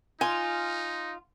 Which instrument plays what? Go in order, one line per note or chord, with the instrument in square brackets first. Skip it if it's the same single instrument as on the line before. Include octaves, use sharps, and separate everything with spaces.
[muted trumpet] D#4 [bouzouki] F4 [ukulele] G#5